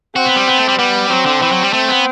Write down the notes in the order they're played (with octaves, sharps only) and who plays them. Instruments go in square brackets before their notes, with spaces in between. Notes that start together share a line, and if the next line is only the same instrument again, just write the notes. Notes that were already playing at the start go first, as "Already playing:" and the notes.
[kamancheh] C4 [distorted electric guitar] F#4
[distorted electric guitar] B3
G3
B3
A3
G3
[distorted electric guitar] G3 [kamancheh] B3
[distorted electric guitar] F#3 [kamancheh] C4
[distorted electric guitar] D3
E3
F#3
G3
[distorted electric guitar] A3 [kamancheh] C4
[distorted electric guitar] B3